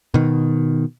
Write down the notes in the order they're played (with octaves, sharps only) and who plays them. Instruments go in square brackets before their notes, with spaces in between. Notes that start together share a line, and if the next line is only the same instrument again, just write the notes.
[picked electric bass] B2 D#3